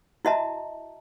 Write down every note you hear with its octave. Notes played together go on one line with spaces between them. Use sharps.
E4 F#4 D#5 E5 A5 A#5